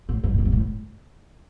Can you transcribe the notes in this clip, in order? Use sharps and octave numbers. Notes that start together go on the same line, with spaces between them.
A2
G2
A2
G2
B2
A2